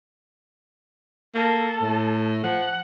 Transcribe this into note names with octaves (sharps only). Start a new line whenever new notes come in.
A#3 A4
A2
F3 F#5